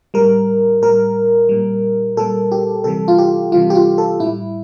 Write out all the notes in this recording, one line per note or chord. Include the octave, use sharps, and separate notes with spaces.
A2 G3 A#4
A2 G3 A#4
A#2 G3
A#2 G3 A4
G4
C3 E3 G3 A4
F4
G4
C3 E3 G3 F4
G4
F4
A4
A2 G3 E4